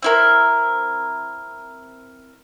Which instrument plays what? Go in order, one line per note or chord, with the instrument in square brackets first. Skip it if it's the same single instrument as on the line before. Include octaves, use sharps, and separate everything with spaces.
[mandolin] C4 E4 A#4